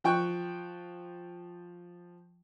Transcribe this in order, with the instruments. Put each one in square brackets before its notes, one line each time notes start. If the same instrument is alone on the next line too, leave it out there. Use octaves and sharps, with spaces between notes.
[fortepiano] F3 G5 C#6 F#6